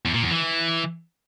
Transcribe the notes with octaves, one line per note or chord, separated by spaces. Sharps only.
E2
A#2
E2
E3